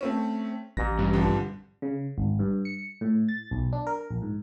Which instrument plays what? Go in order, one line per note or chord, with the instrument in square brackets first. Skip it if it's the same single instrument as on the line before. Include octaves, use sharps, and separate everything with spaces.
[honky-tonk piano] A3 C4 C#4
[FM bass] A1 [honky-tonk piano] A#6
[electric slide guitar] G2
[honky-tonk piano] C2 D3 F3
[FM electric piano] C#3
G#1
G2
C#7
A2
A6
B1
D4
A#4
A#1
G#2